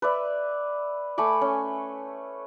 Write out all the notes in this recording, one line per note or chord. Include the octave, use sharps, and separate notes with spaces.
B4 D5 E5
A3 G#5 B5 D6
C#4